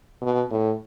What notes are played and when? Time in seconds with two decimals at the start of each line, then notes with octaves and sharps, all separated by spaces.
0.22 B2
0.51 A2